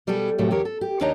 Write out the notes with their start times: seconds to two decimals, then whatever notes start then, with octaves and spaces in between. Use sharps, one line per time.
0.07 B2 G3 B3 G#4 A4
0.38 D#2 A2 C3 F#3 A3
0.51 E2 D3 G4 A#4 C#5
0.65 A4
0.81 G4
1.00 D#2 D4 D#4 C#5 D#5 A#5